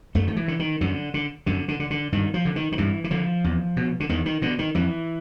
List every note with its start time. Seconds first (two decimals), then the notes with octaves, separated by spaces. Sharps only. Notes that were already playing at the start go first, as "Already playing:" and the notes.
0.15 F#2 A3
0.28 D#3
0.37 E3
0.48 D3
0.59 D#3
0.81 F#2 D3
1.14 D3
1.46 F#2 D3
1.68 D3
1.80 D3
1.90 D3
2.12 G2 D#3
2.34 F3
2.45 D3
2.56 D#3
2.72 D#3
2.78 G2 E3
3.04 E3
3.11 D3 F3
3.44 E2
3.77 B2
4.00 D3
4.09 E2 D#3
4.26 D#3
4.42 B2 D3
4.59 D#3
4.75 F2 E3